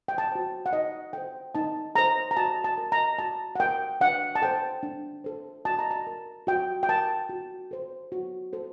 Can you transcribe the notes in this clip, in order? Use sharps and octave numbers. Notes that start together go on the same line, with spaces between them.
G5
A5
F#4 C5
F#5
D#4 D#5
A4 C5 G5
D#4 A5
A4 C5 A#5
A#5
F#4 A5
A5
A#4
A#5
F#4 A5
F#5
A#4 G5
D4 F#5
A5
A4 C5 G5
D4
A4 C5
F#4 A5
A#5
A5
A#4
F#4 G5
G5
A#4 A5
F#4
A4 C5
F#4
A4 C5